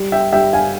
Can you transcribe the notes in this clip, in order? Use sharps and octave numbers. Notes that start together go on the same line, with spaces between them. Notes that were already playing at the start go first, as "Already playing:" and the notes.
Already playing: G3
E5 G5
G3 E5 G5
F5 G#5